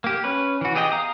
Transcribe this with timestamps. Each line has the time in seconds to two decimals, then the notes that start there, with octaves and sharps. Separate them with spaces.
0.04 A#3 G4
0.24 C#4 B4
0.61 E3 F#4
0.75 B3 G4 G#4 D#5 G5
0.92 F5 A#5 D#6